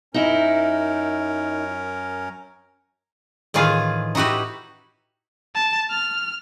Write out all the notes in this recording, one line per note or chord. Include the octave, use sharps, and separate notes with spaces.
F#2 C#4 D#4 E4 A#4
A2 D#3 E3 F4 G#4 F5
D#4 E4 F#4 G4 B4
A5
F6